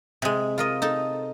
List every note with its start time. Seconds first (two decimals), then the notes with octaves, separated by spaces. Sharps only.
0.22 C3 G#3
0.58 F4 A#4 D#5
0.82 D#4 A4 A5